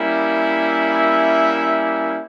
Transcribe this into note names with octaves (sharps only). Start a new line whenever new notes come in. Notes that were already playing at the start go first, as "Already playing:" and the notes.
Already playing: G3 A#3 C#4 E4
E5